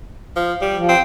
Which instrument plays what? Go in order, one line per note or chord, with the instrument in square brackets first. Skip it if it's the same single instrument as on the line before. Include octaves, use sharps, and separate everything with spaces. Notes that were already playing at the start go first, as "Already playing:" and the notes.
[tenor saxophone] F3
G3
[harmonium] F3
[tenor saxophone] C4